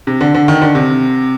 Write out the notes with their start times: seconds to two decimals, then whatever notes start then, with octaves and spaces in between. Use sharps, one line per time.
0.07 C3
0.21 D3
0.35 D3
0.48 D#3
0.62 D3
0.75 C3